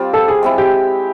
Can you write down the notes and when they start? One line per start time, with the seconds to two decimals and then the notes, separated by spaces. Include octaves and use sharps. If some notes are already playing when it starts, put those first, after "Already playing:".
Already playing: G3 C4 F4 D5
0.14 A4
0.28 G#4
0.43 G#3 C4 E4
0.58 G4